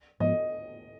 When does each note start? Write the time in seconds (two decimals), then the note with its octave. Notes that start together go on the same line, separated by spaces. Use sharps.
0.20 G#2 F3 B3 D#5